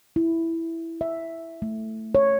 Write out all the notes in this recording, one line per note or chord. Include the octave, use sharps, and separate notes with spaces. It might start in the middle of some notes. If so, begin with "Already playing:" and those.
E4
E5
A3
C#5